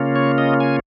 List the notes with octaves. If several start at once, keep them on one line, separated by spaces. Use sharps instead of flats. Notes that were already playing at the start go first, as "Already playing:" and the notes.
Already playing: C#3 A#3 C#4 F4
C#5
D#5
G#5